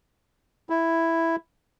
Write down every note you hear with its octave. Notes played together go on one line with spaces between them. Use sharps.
E4